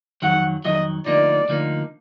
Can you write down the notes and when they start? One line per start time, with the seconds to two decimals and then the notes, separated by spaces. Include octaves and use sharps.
0.22 F2 D#3 F#3 F#5
0.65 F2 D#3 F#3 D#5
1.06 D2 D3 F3 A#3 D#4 D5
1.49 D2 D3 F3 A#3 D#4